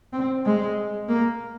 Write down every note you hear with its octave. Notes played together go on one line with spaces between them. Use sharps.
C4
G#3
A#3